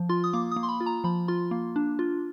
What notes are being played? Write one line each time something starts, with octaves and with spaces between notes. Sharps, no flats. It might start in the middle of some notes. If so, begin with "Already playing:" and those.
Already playing: F3
F4 C6
D#6
A#3 D6
D#6
A#3
C6
B5
F4
A#5
F3 B5
F4 C6
A#3
D4
F4